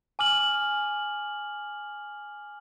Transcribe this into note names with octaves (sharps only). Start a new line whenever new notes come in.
G#5 D6 F6 F#7